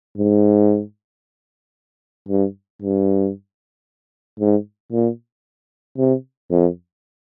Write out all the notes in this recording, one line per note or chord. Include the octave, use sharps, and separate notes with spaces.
G#2
G2
G2
G#2
A#2
C3
F2